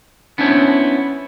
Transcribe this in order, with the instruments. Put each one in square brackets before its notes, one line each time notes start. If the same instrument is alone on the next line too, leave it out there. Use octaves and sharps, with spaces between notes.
[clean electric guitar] B3 C#4 D4 E4 C5 C#5